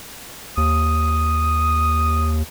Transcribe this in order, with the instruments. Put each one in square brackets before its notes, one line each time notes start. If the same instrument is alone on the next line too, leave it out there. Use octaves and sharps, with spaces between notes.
[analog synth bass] D#2 [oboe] D#6